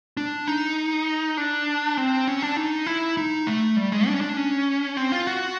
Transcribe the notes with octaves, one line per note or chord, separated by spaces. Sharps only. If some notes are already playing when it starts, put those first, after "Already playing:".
D4
D#4
D4
C4
C#4
D4
D#4
E4
D#4
A3
G3
G#3
D4
C#4
D4
C#4
C4
F4
F#4